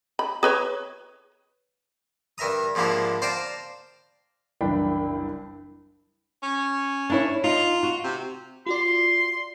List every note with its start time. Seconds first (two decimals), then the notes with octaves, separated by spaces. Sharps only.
0.19 B5
0.43 G#4 B4 C#5
2.38 G2 A#4 E5 A#5 D#6
2.75 G#2 F3 A#3 D4 E4 G4
3.22 C5 D5 F5 G5 A5 A#5
4.61 F#1 C2 E3 D4 G5 B5
6.43 C#4
7.10 D4 E4 C#5
7.44 D#4 F4
7.83 F#4
8.04 C3
8.66 F4 F#4 D5 C6